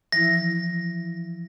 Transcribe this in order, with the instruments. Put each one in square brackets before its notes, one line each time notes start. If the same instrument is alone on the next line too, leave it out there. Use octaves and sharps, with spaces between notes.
[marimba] E3 F3 E4 [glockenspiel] A#6